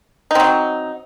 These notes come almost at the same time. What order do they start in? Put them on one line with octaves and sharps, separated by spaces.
D#4 C4 F#3